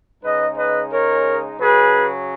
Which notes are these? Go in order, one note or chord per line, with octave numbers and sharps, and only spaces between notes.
C#3 G#3 D#4 B4 D#5
B4 D#5
A#4 C#5
C#3 F#3 C#4 G#4 B4